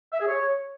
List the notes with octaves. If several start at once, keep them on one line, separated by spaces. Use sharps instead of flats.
E5
G#4
C#5